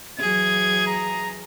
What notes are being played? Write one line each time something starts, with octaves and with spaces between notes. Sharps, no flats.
E3 F#3 G#4 G#6
A#5